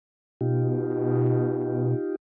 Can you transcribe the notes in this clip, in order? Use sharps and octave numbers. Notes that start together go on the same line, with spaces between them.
B2 D#4 F4 G4